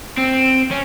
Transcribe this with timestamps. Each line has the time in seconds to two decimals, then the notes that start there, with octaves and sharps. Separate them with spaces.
0.17 C4
0.71 C#4